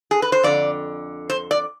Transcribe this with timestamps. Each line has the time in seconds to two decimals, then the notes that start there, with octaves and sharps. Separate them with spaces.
0.11 G#4
0.22 B4
0.32 C5
0.43 F2 D3 D5
1.30 C5
1.51 D5